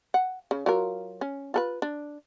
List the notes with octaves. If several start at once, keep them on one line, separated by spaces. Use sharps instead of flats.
F#5
C#3
F#3 F4 A#4
C#4
F4 A4 B4
D4